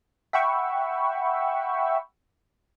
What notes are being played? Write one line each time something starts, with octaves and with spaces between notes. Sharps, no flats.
E5 F#5 G5 B5 C#6 E6